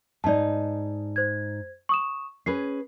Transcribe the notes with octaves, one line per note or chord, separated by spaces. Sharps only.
G#2 D#4 D5 A5
C5 G#6
C#6 D#6 E7
C#4 G#4 B4 C7